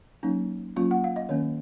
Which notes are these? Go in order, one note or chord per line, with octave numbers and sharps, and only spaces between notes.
F#3 A#3 C#4 D#4
F#3 A#3 C#4 F4
F#5
F5
D#5
D#3 A#3 C#4 C#5